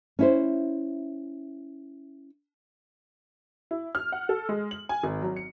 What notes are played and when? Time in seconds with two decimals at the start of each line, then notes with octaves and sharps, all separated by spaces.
0.19 C#4 E4 C5
3.71 E4
3.95 F6
4.12 F#5
4.29 A4
4.49 G#3
4.71 F#7
4.89 G#5
5.03 G#1
5.22 F#3
5.36 C#7